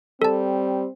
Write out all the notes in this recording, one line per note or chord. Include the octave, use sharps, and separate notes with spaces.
G3 C4 A4 A5